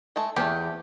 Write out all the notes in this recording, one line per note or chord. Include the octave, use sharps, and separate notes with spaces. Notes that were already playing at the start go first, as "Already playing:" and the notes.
G#3 A3 A4
E2 A3 G4